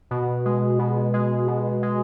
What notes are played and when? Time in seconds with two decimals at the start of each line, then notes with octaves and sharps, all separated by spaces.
0.11 B2
0.46 G#3
0.79 B2
1.14 G#3
1.48 B2
1.83 G#3